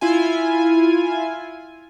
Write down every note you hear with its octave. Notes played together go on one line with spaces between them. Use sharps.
E4 F4 G#5